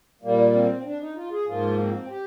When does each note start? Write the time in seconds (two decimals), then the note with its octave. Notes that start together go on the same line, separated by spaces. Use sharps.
0.22 A#2 G3 A#3
0.53 C4
0.84 D4
1.00 D#4
1.16 F4
1.31 G#4
1.46 G#2 F3 A#3 F4
1.78 C4
2.09 G4